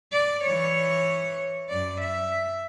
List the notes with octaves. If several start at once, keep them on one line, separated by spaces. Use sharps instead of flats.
D5
E3 C#5
F#2 D5
E5